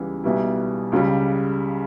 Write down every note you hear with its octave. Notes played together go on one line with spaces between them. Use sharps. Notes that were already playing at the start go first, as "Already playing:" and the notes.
Already playing: C#2 C#3 E3 G3 B3
B1 B2 G3 B3 E4
C#2 C#3 G3